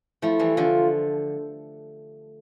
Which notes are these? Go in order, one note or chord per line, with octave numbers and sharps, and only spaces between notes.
F3 A3 E4
E3 G3
D3 F3 F4